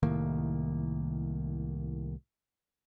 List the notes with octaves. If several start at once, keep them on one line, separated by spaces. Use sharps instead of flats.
C2 A2 D#3 A#3